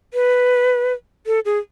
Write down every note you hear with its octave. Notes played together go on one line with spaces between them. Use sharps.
B4
A4
G#4